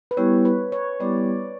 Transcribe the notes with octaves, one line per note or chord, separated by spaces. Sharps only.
B4
G3 B3 E4 G4 C#5
B4
C#5
G3 B3 E4 G4 D5